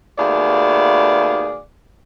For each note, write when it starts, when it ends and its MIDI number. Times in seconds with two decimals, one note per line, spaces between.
0.18 1.59 39
0.18 1.59 47
0.18 1.59 57
0.18 1.59 68
0.18 1.59 74
0.18 1.59 77